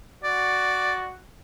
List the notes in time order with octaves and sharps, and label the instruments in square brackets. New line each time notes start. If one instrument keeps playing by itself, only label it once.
[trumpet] F#4 [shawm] D5